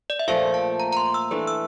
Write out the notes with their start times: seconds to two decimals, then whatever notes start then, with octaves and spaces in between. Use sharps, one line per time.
0.10 D5
0.19 E5
0.27 A#2 F3 A3 F5
0.54 A5
0.80 A#5
0.93 A#5
0.97 C6
1.14 E6
1.31 E3 A3 D4
1.47 E6